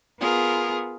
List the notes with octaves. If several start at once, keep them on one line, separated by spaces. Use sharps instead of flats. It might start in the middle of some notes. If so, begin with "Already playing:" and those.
B3 F4 G#4 A#4